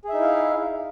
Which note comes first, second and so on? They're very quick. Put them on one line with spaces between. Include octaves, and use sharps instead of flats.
G#4 E5 D#4 E4 F5